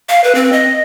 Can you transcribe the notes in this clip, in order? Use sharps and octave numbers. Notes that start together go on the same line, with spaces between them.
F5
B4
C4
D#5